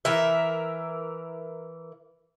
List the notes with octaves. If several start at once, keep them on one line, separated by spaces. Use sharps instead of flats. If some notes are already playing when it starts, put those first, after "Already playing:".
E3 A#4 E5